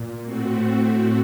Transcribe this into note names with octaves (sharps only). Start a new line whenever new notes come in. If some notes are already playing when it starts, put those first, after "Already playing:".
Already playing: A#2
A2 A3 C4 F#4